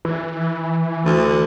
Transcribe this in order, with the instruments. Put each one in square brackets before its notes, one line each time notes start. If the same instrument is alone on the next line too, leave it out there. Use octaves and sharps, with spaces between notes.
[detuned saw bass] E3
[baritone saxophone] D2